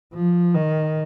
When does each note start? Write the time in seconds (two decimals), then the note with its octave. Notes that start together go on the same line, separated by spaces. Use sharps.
0.13 F3
0.55 D#3